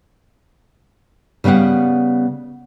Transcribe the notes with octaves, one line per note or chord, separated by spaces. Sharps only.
C#3 G3 B3 F5 F#5